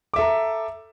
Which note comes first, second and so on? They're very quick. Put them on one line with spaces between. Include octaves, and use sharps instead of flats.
D6 E5 A4 A#5